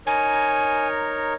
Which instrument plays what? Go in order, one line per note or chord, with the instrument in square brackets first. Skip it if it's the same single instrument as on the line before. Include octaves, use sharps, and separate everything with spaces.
[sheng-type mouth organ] D#4 A#4 C#5 [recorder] G#5